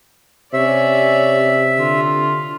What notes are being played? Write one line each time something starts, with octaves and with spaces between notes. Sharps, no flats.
C3 C#4 C#5 D5 E5
D3 F4